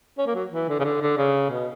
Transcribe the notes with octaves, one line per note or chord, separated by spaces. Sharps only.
C#4
A#3
F#3
E3
D3
C#3
D3
D3
C#3
B2